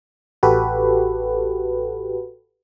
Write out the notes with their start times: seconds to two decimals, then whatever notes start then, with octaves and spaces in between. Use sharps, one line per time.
0.43 A1 F#4 G4 A4 B4